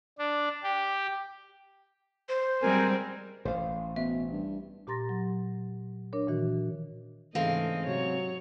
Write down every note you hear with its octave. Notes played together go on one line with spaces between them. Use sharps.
D4
G4
C5
G3 G#3 C4 A#4 G#5
A1 C5 F5
B2 E5
G2
A#2 G4 A#5 C6 A6 A#6
F#3
D4 A#4 C#5
A#2 D#3 E3 F#4
G#2 C#3 E3 G#3 A3 C4 D#5 F5
C3 F#3 C#5